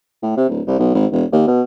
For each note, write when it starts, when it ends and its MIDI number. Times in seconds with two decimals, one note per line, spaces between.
0.23 0.33 45
0.37 0.48 48
0.49 0.61 26
0.67 0.75 36
0.79 0.92 35
0.94 1.06 32
1.12 1.25 28
1.32 1.43 39
1.47 1.62 47